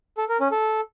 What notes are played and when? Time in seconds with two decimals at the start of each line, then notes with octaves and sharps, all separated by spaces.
0.18 A4
0.29 A#4
0.40 C#4
0.52 A4